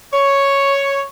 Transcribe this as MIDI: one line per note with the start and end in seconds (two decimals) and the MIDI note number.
0.13 1.03 73